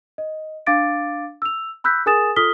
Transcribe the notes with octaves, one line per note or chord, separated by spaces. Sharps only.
D#5
D4 F5 D6 A6 D7
E6 F7
B5 E6 F#6 G6 B6
G#4 A#4 G#5 D#6 A6 E7
F4 A4 D#6 F6 B6 G7